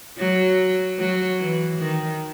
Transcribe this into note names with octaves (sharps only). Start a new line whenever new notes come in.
F#3
F#3
E3
D#3